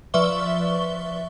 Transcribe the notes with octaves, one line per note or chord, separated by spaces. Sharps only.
F3 B4 D5 E5 C#6 G7